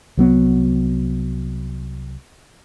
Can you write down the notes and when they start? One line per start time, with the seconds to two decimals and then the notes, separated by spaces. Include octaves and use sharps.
0.17 C2 F#3 B3